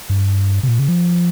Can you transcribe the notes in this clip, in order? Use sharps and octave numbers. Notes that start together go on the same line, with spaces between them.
G2
C3
A#2
C#3
F3